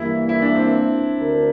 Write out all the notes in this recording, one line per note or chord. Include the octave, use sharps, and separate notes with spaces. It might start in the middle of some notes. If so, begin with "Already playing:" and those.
Already playing: G2 E3 A#3 E4
E4
D4
C4
D2 D3 A3 E4 A#4